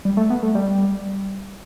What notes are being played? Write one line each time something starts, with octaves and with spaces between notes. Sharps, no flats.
G3
A3
B3
A3
G3